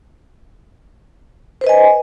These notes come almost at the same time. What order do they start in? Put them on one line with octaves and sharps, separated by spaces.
C5 B4 D#5 G#5